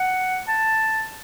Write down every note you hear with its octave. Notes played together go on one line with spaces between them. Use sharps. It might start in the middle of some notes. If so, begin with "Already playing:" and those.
Already playing: F#5
A5